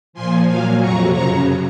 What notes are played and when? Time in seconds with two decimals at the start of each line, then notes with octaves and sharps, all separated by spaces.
0.13 A#2 F3 G#5 C6
0.46 A#2 F#3 F5 G#5
0.79 F2 C3 F#3 A#5 C#6
1.12 F#2 C#3 F#3 A#5 C#6